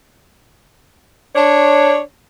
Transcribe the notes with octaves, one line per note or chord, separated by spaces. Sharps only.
D4 C#5